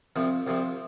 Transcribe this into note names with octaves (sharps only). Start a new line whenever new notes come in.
C2 C3 F3 C4
C2 C3 F3 C4